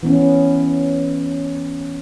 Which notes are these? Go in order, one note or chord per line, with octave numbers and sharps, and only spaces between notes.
E3 B3 C#4